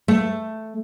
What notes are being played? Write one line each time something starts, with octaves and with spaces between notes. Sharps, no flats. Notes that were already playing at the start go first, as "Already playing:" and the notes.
A3